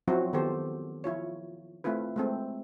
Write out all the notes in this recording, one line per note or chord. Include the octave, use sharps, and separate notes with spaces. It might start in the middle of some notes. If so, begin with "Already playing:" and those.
F3 F#3 C4 E4 F#4 C5
D#3 B3 G4 A4 C5
F3 E4 F4 C#5
A3 C4 E4 F4 B4
G#3 A3 C4